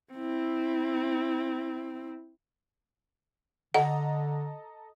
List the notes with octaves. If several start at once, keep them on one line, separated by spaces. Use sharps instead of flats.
C4 E4
D3 A4 D#5 F#5 A#5